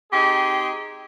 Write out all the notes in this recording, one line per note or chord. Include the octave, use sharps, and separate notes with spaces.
C4 D#4 G4 G#4